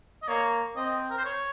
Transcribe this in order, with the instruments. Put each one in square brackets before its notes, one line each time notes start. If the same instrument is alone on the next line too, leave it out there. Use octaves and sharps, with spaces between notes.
[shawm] D#5
[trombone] A#3 [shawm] C#5
[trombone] C4 [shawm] D#5
[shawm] A#4
C5
C#5